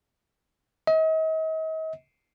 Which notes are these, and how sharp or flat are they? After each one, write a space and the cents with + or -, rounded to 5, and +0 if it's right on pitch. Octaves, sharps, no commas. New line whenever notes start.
D#5 +40